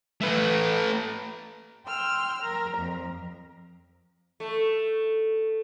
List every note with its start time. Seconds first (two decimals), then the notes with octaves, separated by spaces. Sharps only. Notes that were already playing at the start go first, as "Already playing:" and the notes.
0.21 A3 B4
1.86 G5 C6 E6 F6
2.43 A#4
2.78 F2
4.40 A3